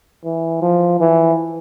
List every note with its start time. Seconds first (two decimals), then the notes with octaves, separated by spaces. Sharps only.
0.25 E3
0.62 F3
1.00 E3